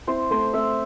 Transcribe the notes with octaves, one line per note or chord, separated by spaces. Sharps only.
C4 E4 C5
A3 C4 C5
A3 C4 E5